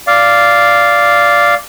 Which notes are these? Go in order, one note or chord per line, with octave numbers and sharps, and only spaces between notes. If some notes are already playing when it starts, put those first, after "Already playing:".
D5 F5